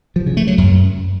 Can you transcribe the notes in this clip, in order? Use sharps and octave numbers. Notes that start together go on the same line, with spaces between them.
F3
C#3
A3
F#3
F#2